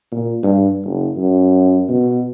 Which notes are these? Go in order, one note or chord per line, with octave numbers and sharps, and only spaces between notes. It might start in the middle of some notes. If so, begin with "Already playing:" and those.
A#2
G2
F#1
F#2
B2